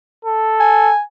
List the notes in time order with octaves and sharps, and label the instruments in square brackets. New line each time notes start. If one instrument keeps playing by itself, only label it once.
[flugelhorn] A4
[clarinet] G#5